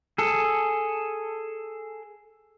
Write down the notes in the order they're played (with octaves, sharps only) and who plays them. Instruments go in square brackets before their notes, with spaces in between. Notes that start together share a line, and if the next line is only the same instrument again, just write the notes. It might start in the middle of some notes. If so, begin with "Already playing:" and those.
[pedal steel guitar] G#4 A4